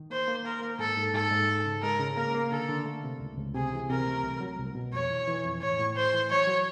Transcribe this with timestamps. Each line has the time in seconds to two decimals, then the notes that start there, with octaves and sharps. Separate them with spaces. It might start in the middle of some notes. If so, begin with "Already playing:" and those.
Already playing: D#3
0.10 A#3 C5
0.28 A#3
0.45 A#3 A#4
0.62 A#3
0.79 G#2 A4
0.97 G#2
1.13 G#2 A4
1.31 G#2
1.49 G#3
1.65 C#3
1.83 G#3 A#4
2.00 C#3
2.17 A#3 A#4
2.35 A#3
2.51 D3 A4
2.69 D3
2.86 A3
3.04 C3
3.20 C#2
3.37 C#2
3.55 C3 G#4
3.73 E3
3.90 C3 A#4
4.07 A3
4.24 C2
4.41 F#3
4.59 C2
4.75 B2
4.93 F2 C#5
5.10 E3
5.28 E3
5.44 F2
5.61 A2 C#5
5.79 A2
5.96 E3 C5
6.14 E3
6.30 F#3 C#5
6.47 F#3